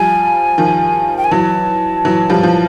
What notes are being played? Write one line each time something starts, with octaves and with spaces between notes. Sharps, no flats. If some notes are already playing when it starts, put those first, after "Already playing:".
Already playing: F3 G3 G#5
D#3 F3
G5
G#5
E3 F#3 A5
E3 F#3
F3 G3
F3